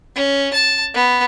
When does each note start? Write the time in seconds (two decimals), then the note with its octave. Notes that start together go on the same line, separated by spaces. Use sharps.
0.16 C#4
0.54 A5
0.94 B3